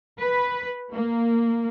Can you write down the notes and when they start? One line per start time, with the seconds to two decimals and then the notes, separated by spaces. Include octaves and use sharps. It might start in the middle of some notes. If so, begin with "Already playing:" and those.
0.20 B4
0.93 A#3